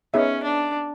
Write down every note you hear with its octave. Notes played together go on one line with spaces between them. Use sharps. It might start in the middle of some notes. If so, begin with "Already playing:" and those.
B3 C#4 D#4 G#4 C#5 E5
D4